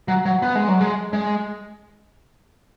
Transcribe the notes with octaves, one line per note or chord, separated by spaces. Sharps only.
F#3
F#3
B3
G#3
F#3
G#3
G#3